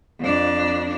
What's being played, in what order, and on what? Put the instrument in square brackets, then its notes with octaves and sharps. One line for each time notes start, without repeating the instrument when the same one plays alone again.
[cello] F2 D4